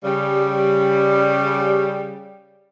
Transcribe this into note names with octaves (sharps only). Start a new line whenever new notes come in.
C#3 G3